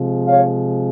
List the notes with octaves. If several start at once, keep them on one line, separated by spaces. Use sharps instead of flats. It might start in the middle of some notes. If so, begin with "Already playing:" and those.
Already playing: C3 F3 G#3
C#5 F5